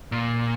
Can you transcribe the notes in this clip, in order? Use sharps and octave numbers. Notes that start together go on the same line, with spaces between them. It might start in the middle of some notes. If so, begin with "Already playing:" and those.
A#2